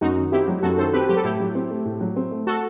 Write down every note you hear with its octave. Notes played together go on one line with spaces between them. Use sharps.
F#2 D#4 F#4
D#3
C4 E4 G4
F#3
F#2 F#4 A4
D#3 A4 C5
C4 G4 B4
F#3 G4
A4
A2 E4 G4
F#3
C4
A3
A2
F#3
C4
A3
F#4 A4